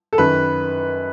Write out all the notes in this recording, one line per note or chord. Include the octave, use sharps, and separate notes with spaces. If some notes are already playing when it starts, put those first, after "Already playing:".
A4
F#2 D#3 B4